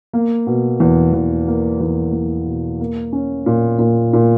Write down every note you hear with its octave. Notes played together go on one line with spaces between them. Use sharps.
A#3
B2
E2
E2
A#3
E2
E2
B2
A#3
C#4
A#2
A#2
A#2